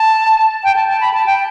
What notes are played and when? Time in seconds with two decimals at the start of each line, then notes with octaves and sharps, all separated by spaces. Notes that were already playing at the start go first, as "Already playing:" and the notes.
Already playing: A5
0.64 G5
0.76 A5
0.88 A5
1.01 B5
1.14 A5
1.26 G5